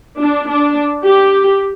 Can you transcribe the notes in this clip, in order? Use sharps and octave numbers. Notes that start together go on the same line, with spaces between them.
D4
D4
G4